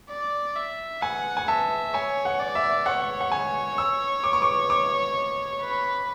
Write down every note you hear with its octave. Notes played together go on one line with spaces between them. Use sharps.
D5
E5
F#5 G#5
G#5
E5 A5
C#5 G#5
F#5
D5
E5
C#5 F#5
F#5
G#5
E6
D6
C#6
D6
D6
B4